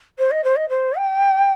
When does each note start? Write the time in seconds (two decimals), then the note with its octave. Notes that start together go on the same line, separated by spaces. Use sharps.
0.18 C5
0.31 D#5
0.44 C5
0.56 D#5
0.69 C5
0.97 G5